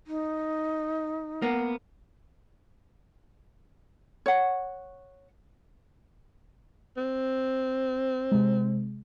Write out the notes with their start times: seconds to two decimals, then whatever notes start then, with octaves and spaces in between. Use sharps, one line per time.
0.07 D#4
1.42 A#3 B3
4.26 C#5 F#5
6.97 C4
8.32 C3 G#3